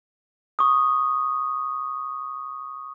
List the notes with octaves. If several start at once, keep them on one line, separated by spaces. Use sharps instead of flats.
C#6 D#6